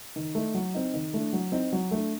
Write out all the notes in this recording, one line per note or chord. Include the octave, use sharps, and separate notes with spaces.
D#3
A3 D#4
F#3
C4 D#4
D#3
A3 D4
F#3
C4 D#4
F#3
A3 D4